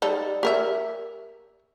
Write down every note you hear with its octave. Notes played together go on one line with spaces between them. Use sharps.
G3 D#4 A4
G4 A#4 E5